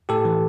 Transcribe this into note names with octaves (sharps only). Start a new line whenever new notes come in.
A2 G4 A4
E3